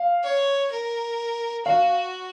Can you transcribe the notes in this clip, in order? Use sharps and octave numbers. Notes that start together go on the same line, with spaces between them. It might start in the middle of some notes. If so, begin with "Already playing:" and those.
Already playing: F5
C#5
A#4
F#4 F5